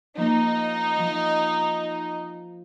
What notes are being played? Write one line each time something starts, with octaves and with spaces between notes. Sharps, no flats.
F3 A#3 D#4
F3